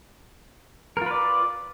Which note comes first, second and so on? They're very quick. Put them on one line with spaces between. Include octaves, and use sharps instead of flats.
A#4 F4 B4 D5